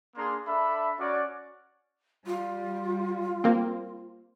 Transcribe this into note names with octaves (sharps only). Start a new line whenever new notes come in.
A#3 D4 G#4 A#5 C6
D4 A4 E5 B5
C#4 F#4 D5
G3 F4
A#3 C4